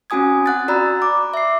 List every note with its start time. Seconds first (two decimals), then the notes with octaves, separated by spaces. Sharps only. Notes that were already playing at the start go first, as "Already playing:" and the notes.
0.10 C4 C#4 F#4 G#5 D#6 G#6
0.46 F#5 F#6 A6
0.68 F#4 D5 A#5 B5 E6
1.02 D6
1.34 E5 C7